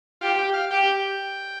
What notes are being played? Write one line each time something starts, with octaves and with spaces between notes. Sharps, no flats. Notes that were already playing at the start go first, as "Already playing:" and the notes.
F4 G4
G4
F5
G4 G5